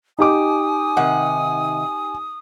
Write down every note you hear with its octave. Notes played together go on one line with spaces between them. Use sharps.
D#4 G4 G#5 D6 D#6
C3 D#3 F#5